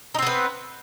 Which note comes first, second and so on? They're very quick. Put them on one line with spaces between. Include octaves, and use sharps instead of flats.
D#4 C4 B3 B4